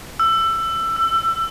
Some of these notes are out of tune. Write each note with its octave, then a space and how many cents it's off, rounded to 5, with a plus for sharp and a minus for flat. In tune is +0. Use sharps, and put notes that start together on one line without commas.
E6 +20
E6 +30